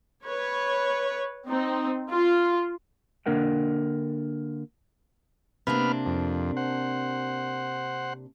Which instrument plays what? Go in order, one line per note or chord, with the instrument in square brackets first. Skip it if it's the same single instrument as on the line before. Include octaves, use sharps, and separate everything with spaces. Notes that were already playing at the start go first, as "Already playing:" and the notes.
[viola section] B4 C#5
C4 D#4
F4
[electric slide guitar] D3 A#3 D4 A#4 F#5 G5
[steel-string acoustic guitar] C3 A#3 D4 [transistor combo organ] B3 B4 F6
[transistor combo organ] F2
C5 F#5